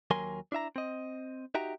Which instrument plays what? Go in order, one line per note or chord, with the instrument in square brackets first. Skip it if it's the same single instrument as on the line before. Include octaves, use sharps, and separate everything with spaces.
[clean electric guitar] D#2 F#3 A#4 G#5 C6
D4 E4 E5 A#5
C4 D#5
D#4 F#4 G4 E5 G5 A#5